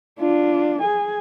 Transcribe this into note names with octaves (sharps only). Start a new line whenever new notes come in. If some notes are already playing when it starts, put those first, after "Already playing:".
D4 F4
G#4 G#5